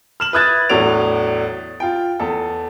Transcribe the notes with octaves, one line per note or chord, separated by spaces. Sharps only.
F6 E7 F#7
B4 E5 D#6 F#6 G#6 A6
E2 A2 F#3 D4 D7 F7
F4 G5
E2 A4